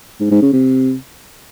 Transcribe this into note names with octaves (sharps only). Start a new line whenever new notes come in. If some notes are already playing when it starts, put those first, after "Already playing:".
G#2
G#2
C#3
C3